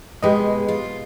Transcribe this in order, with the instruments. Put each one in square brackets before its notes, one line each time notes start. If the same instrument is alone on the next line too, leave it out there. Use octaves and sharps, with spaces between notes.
[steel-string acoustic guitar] B2 G#3 [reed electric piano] G4 B4 D#5
[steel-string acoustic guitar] F4